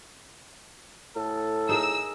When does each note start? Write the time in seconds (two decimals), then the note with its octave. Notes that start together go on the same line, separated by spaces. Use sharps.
1.16 A2 A4
1.69 D#4 G#4 A#4 E6